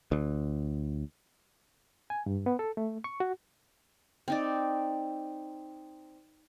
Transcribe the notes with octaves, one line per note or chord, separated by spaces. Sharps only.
D2
G#5
G2
B3
A4
A3
C#6
F#4
C4 D#4 D5